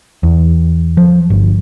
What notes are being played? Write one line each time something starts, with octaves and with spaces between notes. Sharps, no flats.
E2
F3
G1